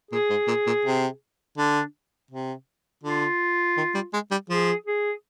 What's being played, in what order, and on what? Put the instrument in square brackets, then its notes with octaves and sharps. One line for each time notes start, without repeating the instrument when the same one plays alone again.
[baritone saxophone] A#2 [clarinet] G#4
[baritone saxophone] G#2
A#2
A#2
C3
[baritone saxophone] D3 [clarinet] D4
[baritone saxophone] C3
[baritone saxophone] D3 [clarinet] F4
[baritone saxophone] D#3
G3
G#3
G3
[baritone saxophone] F3 [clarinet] G#4
[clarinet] G#4